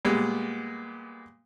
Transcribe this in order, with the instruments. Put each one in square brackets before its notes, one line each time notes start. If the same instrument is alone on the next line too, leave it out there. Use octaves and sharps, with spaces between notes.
[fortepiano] A#2 G3 G#3 B3